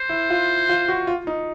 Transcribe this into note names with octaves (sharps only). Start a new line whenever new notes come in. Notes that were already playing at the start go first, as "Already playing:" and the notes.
Already playing: C5
E4
F4
F4
F#4
F4
D#4